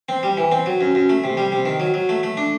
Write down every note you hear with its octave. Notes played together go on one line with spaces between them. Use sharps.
C4
G3
E3
C4
F#3
F#2
F#2
A3
C3
G3
C3
D#3
F#3
F#3
A3
A3
D4